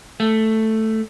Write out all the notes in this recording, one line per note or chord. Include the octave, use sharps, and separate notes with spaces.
A3